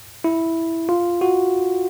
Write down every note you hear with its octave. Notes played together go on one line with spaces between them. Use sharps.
E4
F4
F#4